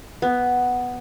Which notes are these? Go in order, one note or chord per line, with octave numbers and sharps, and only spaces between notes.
B3